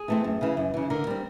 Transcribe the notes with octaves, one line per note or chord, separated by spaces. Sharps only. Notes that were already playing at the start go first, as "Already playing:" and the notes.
Already playing: G#4
E3 A3 C4
F#2
C#3 E3
F#2
C#3 E3
D3 A#4
G3 C4